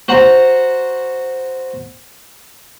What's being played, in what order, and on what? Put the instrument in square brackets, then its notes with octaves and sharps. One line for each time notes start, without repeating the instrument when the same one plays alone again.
[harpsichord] F#4 C5 F#5 A#5